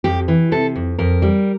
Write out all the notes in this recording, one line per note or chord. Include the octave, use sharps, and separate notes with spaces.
F2 G4
E3
C3 A4
F2
F2 A#4
G3